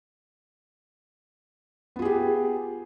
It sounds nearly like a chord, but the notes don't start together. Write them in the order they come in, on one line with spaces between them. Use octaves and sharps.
B3 F4 G#4 G4